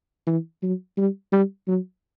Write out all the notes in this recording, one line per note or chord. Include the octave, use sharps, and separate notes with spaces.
E3
F#3
G3
G3
F#3